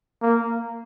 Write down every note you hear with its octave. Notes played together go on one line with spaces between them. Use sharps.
A#3